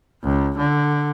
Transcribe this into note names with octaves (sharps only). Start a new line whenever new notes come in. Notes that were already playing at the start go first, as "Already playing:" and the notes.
C#2
D3